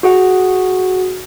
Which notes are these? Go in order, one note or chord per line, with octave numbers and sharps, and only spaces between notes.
F#4 G#4 F#5